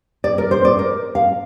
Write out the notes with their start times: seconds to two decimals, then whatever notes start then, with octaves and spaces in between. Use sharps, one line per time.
0.24 D5
0.38 A#4
0.51 C5
0.65 D5
0.79 A#4
1.15 F5